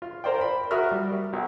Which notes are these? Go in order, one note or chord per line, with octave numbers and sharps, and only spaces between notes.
F4
A#4 C5 D5 G5
B5
F#4 A#4 E5 D#6 F6
G3
B1